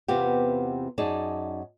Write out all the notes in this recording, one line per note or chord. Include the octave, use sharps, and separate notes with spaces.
E2 C3 B3 C4 F4 G4
F#2 D#4 G#4 D5 A5